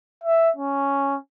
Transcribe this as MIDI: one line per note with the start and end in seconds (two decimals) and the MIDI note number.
0.23 0.50 76
0.56 1.16 61